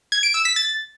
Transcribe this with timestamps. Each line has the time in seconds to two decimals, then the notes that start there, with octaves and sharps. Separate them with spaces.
0.12 G#6
0.23 D7
0.34 E6
0.45 B6
0.56 A6